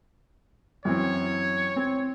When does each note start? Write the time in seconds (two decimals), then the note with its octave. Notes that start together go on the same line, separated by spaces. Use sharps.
0.85 F#2 E3 C4 C#5
1.76 C4